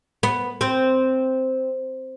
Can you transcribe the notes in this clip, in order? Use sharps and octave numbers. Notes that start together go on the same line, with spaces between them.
B3
C4